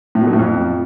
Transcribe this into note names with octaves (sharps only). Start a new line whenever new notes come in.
A2
B2
F#3
A2
F2